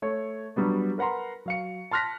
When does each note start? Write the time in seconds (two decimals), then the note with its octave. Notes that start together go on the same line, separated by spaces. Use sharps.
0.02 A3 C#5
0.56 F#3 G3 B3 D4
0.98 A#4 B4 F#5 A#5 C6
1.46 F#3 F5 C#7
1.91 A5 C6 F6 F#6 A#6 B6